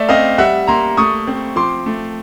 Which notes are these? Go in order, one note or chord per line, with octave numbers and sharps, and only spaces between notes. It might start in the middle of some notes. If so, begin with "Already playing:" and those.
Already playing: A3 D5 E5
C4 D#5 F5
G3 E5 F#5
A#3 A#5 C6
A3 C#6 D#6
C4
F3 C6 D6
A3